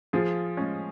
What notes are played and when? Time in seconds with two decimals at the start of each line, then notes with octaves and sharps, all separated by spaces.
0.13 F3 F4 G#4
0.57 G#3 C#4